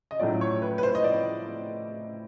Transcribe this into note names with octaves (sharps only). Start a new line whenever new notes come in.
D#5
A2 F#3 A3 C#4 F4 D5
C#5
B4
B4
C5
D#5
D5